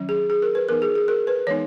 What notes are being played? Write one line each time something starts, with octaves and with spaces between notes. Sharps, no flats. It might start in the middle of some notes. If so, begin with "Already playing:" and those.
Already playing: D#3 F#3 C#4
G#4
G#4
A#4
B4
E3 B3 D#4 A#4
G#4
G#4
A#4
B4
E3 G#3 B3 D#4 C#5